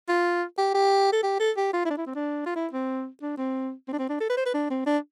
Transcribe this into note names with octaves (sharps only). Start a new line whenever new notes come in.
F4
G4
G4
A4
G4
A4
G4
F4
E4
D4
E4
C4
D4
F4
E4
C4
D4
C4
C4
D4
C4
D4
A4
B4
C5
B4
D4
C4
D4